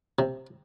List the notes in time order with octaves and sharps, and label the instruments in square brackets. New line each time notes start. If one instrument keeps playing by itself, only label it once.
[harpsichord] C3